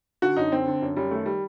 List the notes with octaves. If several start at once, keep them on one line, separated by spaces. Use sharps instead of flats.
D3 F#4
F#2 D#4
D3 C4
D3
F#2
F#2 G3
D#3 A3
G3